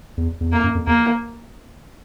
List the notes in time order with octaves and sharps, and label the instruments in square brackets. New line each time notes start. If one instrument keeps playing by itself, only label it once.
[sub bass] E2
E2
[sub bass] F2 [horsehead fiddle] A#3
[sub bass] F#2
F2
[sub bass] E2 [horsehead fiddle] A#3